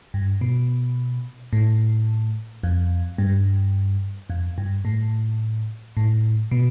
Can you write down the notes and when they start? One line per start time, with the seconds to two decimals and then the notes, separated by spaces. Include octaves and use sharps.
0.14 G2
0.41 B2
1.53 A2
2.63 F2
3.18 G2
4.30 F2
4.58 G2
4.85 A2
5.97 A2
6.51 B2